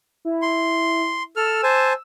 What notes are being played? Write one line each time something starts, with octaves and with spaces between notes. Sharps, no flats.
E4
C6
A4 E6 F6
C5 G#5 A5